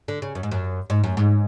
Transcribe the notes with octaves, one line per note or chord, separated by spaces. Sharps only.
D3
C#3
F#2
G#2
F#2
G#2
F#2
G#2